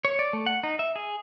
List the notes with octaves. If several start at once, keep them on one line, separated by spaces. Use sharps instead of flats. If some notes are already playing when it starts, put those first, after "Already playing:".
C#5
D5
A3
F#5
D#4
E5
G#4